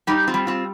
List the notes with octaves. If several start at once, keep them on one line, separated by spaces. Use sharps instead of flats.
G3 D#4 G4
C4 F4
G3
C4 F4